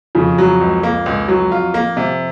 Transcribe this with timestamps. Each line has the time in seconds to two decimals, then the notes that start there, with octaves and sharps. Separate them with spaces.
0.15 F2 C#3 F3
0.38 F#3
0.61 C#2
0.83 A#3
1.06 C#2
1.28 F#3
1.52 F4
1.74 A#3
1.97 C3